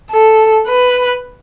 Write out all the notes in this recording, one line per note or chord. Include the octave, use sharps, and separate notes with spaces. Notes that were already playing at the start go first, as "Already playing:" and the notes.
A4
B4